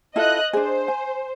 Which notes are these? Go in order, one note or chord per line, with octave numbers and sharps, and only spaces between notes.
E4 F4 A4 D#5 F#6
D4 G#4 C5
G#5